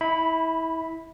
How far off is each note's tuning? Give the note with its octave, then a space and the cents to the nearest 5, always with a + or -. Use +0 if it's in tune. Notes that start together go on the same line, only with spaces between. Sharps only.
E4 -25 B5 +0